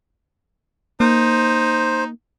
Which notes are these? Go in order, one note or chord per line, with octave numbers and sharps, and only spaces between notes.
A#3 D#4 C5